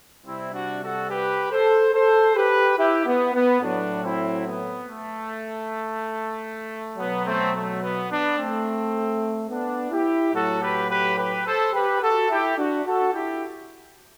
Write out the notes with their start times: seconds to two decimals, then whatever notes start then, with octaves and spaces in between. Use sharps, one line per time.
0.25 C3 G3 C4 E4
0.53 D4 F#4
0.82 F#4 A4
1.09 G4 B4
1.51 A4 C5
1.94 A4 C5
2.35 G4 B4
2.77 E4 G4
3.06 B3
3.34 B3
3.61 A2 F#3 D4 F#4
4.03 C4 E4
4.46 B3
4.87 A3
6.98 B2 F#3 B3
7.25 A3 C4
7.54 A3
7.82 B3
8.09 B3 D4
8.37 A3 C4
9.50 B3 D4
9.91 E4 G4
10.34 A2 F#3 F#4 A4
10.61 G4 B4
10.89 G4 B4
11.17 G4 B4
11.45 A4 C5
11.73 G4 B4
12.02 F#4 A4
12.30 E4 G4
12.58 D4 F#4
12.85 F#4 A4
13.13 E4 G4